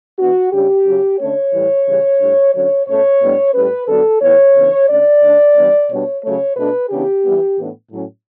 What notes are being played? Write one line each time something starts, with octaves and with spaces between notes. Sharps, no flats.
E3 B3 D4 F#4
C#3 G3 D4 G4
C#3 F#3 C#4
D3 A3 C#4 C#5
A2 E3 G3
C#3 E3 G3 C#4
A2 G3 D4
D3 F#3 C#4 C#5
B2 A3 C#4 C#5
A2 G3 B3 D4
A2 G3 C#4 B4
D3 F#3 B3 D4 A4
A2 E3 B3 C#5
C#3 E3 B3 D4
D3 A3 C#4 D5
D3 A3 D4
E3 G3 B3 D4
B2 G3 B3 D4 C#5
C#3 F#3 A3 C#5
B2 A3 D4 B4
C#3 E3 B3 D4 G4
E3 G3 B3
A2 E3 B3 D4
A2 F#3 C#4